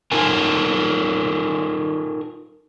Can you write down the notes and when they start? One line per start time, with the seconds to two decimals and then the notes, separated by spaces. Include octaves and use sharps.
0.12 D#4 F4 A4 A#4 G#5